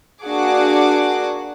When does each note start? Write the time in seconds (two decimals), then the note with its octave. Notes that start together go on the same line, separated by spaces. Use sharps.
0.23 A#3 D4 F#4 G#4 F#5 D6